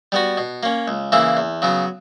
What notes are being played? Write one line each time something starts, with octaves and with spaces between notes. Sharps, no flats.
G3 B3 F#4
B2
A#3 C#4
C#2
C#3 E3 A#3 E4
E2
C#3 F#3 B3